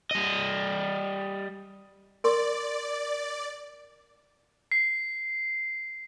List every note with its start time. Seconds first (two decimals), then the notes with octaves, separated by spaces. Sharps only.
0.11 G3 D#5
2.24 A#4 D5 C6 C#6
4.72 C7